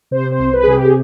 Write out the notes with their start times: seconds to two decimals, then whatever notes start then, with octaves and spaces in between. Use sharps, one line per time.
0.11 C3 C5
0.32 C5
0.39 C2
0.53 B4
0.63 C3 G#4
0.74 G4
0.85 G#4